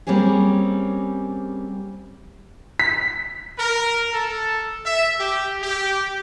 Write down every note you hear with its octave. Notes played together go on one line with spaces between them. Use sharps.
G3 A#3 C4 C#4 G#4
B6
A#4
A4
E5
G4
G4